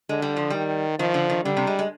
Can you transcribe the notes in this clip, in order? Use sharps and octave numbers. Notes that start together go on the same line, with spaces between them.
D3 G#3
G3
F3
D#3 G3
D#3 F3
D3
D#3
D3 G3
C3
G#3
G#3